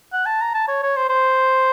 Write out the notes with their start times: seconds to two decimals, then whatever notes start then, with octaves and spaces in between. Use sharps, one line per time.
0.13 F#5
0.26 A5
0.41 A#5
0.54 A5
0.68 C#5
0.83 C#5
0.96 C5
1.09 C5